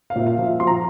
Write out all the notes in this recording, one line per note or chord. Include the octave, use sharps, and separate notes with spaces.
F5
A#2 E5
F5
F3
E5
F3 C6
A#5